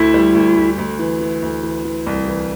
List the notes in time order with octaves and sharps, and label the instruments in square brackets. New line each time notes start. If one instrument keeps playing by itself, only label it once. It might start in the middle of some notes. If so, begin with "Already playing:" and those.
Already playing: [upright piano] D2 [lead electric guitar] E4
[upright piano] G3
D2
D2
D2
E3
E3
D2
E3
E3
C2
E3